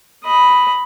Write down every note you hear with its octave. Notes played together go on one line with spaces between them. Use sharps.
D#5 B5